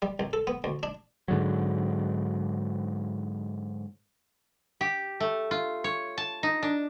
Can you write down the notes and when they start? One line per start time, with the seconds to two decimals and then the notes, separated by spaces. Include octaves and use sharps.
0.02 G3
0.19 C2
0.33 A4
0.47 B3
0.64 D2
0.83 D4
1.28 G#2 D3 F#3
4.81 G4
5.20 A3
5.51 F4
5.84 C#5
6.18 A5
6.43 D#4
6.63 D4